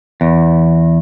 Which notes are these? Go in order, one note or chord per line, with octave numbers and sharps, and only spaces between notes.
E2